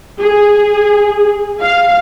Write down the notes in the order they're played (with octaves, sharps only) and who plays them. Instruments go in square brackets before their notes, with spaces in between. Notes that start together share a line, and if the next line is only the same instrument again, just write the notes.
[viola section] G#4
F5